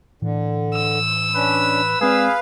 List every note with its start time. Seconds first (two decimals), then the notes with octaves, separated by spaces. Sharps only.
0.22 A2 D3 E3
0.75 E6
1.35 C#4 D4 B4
2.01 G#3 C4 G#4 B4 D5 F5